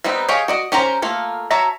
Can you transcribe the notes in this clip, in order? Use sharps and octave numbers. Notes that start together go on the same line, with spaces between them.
G3 B3 C4 D#4
G4 G#4 C#5 D#5 F5
F#4 D5 D#5
C#4 G4 A#4 C5 A#5
A3 A#3 F4
F#4 C#5 E5 A5 A#5